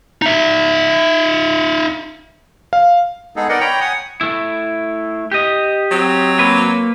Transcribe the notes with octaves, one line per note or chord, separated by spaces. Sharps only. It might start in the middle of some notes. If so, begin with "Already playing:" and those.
D#4 E5
F5
G#3 B3 D#4 G#4 A4
B3 D#4 A#4 D5 D#5 F#5
C#5 G5 A#5 B5
F#5 G#5 D#6
A3 E4
G4 D#5
F#3 C4
A#3 B4